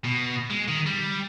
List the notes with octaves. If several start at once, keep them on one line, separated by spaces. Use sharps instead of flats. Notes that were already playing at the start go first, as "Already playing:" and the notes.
B2
G#3
D#3
G3